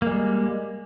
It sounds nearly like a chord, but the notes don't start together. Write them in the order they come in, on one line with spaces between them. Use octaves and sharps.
A#3 G#3 G3